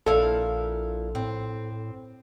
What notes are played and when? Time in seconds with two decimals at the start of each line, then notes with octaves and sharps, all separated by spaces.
0.06 A#1 A#2 E4 A4 F5
1.15 A2 C4